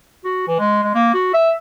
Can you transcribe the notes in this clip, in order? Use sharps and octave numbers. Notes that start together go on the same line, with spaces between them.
F#4
E3
G#3
G#3
A#3
F#4
E5